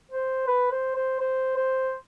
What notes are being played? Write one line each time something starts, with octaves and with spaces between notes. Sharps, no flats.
C5
B4
C5
C5
C5
C5